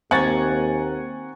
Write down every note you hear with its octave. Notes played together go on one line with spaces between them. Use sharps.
D#2 A#3 C4 F#5 G#5 A#5 C#6 A6